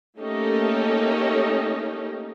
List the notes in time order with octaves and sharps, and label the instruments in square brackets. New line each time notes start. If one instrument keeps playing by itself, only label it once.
[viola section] A3 A#3 C#4 D#4 G4 A4